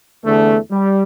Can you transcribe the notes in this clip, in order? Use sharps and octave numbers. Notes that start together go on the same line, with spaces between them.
E2 D3 A3
G3